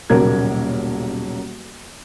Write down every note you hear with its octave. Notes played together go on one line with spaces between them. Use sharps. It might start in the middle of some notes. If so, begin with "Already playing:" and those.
D#1 B1 C#3 A#3 A#4 G#6